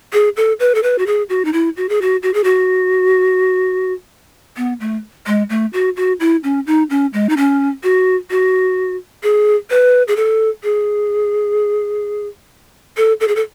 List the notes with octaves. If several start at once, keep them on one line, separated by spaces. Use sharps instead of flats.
G#4
A4
B4
A4
B4
F#4
G#4
F#4
D#4
E4
F#4
G#4
F#4
F#4
G#4
F#4
B3
A3
G#3
A3
F#4
F#4
E4
C#4
D#4
C#4
G#3
D#4
C#4
F#4
F#4
G#4
B4
G#4
A4
G#4
A4
A4
G#4
A4